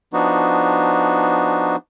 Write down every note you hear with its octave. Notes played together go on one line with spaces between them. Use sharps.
F3 B3 D4 D#4 F#4